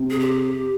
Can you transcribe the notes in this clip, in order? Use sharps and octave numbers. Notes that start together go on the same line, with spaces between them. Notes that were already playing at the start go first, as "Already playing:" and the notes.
Already playing: C3
G#4
G4